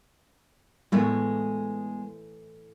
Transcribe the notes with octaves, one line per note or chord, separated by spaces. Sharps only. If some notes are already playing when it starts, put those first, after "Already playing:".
A2 E3 G#3 A3 B3